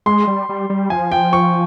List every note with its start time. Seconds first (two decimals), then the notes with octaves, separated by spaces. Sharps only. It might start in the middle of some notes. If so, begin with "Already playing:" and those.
0.06 G#3 C6
0.27 G3
0.49 G3
0.70 G3
0.90 F3 G#5
1.12 G5
1.33 C#6